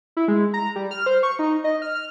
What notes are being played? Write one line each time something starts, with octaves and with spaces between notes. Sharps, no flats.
E4
G#3
A#5
G3
F6
C5
C#6
D#4
D#5
F6
F6